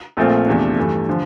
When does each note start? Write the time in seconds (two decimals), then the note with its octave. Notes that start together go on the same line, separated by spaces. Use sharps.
0.17 A#1 A#2 A3 C4 F4
0.47 E2 C3 F3 A3 D4
0.77 G2 E3 A3
1.09 D3 F3